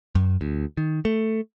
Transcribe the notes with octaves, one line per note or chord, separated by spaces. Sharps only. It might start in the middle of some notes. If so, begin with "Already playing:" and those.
F#2
D2
D#3
A3